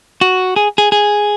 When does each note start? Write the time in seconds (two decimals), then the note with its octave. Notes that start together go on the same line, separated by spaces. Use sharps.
0.21 F#4
0.56 G#4
0.78 G#4
0.92 G#4